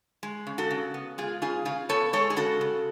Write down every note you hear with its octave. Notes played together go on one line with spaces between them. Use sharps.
G#3
C#3
F#4 A4
C#3
B3
G#3 F4 G#4
C#3 F4 G#4
C#3 F4 G#4
B3 A4 C#5
G#3 A4 C#5
G#4
C#3 F#4 A4
C#3